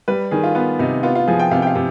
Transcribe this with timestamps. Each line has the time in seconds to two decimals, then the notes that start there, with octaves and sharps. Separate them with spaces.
0.08 G3 B4
0.31 D#3 G#4
0.43 F4
0.55 B3 F4
0.79 C3 D#4
1.03 B3 F4
1.15 F4
1.28 F3 G#4
1.39 G5
1.51 C3 F5
1.62 G5
1.67 F5
1.75 C3